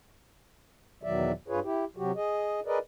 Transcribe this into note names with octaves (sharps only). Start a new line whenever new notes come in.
E2 B2 D#3 F#3 D5 E5
G2 F4 G#4 B4 C#5
E4 G4
C3 F#3 F#4 G4
G#4 D#5
G#4 A#4 B4 D5 D#5